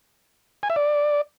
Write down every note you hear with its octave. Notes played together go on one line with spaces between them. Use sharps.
G#5
E5
D5